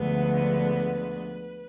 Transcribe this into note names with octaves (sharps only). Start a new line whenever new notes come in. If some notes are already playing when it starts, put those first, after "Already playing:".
Already playing: D2 D3 F3 G#3 B3 B4